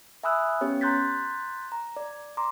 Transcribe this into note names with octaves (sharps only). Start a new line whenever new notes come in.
E5 G#5 B5 D#6 E6 F#6
B3 C#4 G4 C#5
A#5 C6 F#6 G6 A6 B6
A#5
D5
A#5 C6 D6